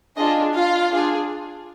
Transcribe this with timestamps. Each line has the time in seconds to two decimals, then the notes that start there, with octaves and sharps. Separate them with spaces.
0.16 D4 F4 G#4 D#5
0.53 F4 F5
0.90 D4 G#4